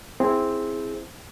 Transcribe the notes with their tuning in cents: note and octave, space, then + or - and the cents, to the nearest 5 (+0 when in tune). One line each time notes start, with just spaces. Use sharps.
C4 +0 E4 +0 G#4 +0